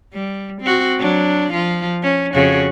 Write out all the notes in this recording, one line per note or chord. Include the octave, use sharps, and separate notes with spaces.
G3
C4 F#4
F#3 D4
F3 F4
C#4
F2 C#3 F#4